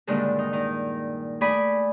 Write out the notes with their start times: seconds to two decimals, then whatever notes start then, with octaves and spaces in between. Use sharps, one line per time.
0.07 G2 A#2 D3 D#3 G3 G#3
0.39 D#4
0.53 D#3
1.41 A3 D5 G#5 B5 D#6